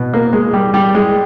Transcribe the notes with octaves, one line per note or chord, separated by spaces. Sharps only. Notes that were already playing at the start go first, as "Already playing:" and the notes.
Already playing: B2
A#3
G#3
G3
G3
G#3